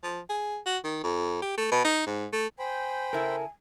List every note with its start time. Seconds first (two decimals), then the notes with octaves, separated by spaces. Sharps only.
0.04 F3
0.30 G#4
0.66 F#4
0.84 D#3
1.04 F2
1.42 G4
1.58 A3
1.72 B2
1.85 D#4
2.06 G#2
2.32 A3
2.59 C5 G5 G#5 B5
3.13 C#3 E4 A4 A#4